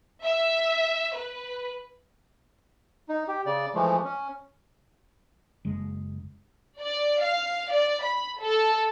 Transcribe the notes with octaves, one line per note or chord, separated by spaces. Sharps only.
E5
B4
D#4
G4
C#3 D5
E3 F3 G#3 A3
C#4
F#1 G#3
D5
F5
D5
B5
A4